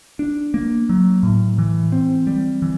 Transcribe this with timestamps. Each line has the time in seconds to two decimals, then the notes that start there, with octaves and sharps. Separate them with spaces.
0.19 D4
0.54 A#3
0.89 F#3
1.23 A2
1.58 E3
1.92 C4
2.27 G3
2.62 E3